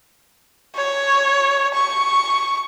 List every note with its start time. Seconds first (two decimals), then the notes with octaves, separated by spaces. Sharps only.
0.76 C#5
1.74 C#6